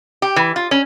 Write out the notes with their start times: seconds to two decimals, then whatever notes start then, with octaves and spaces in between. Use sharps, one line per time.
0.22 G4
0.36 E3
0.56 F4
0.71 C#4